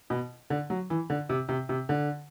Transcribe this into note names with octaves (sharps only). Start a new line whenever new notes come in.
B2
D3
F#3
E3
D3
C3
C3
C3
D3